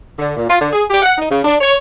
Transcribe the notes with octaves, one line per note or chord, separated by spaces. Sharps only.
D3
A#2
F4
D3
G#4
G4
F#5
D#4
C#3
D4
C#5